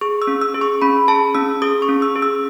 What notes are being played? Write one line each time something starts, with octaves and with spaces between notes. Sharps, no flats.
G#4 C#6
E6
C#4
E6
G#4
C#6
C#4 B5
G#4 A5
C#4 E6
G#4 D#6
C#6
C#4
E6
G#4
E6